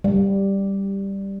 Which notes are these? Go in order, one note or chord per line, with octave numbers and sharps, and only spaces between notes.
G3